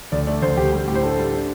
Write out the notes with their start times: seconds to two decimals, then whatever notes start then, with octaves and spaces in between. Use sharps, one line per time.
0.12 D2 D5
0.27 A3 D5
0.42 D2 C5
0.57 D2 G4
0.73 G3
0.88 A2 G4
0.95 C5
1.03 D4 A4
1.18 G3
1.33 D4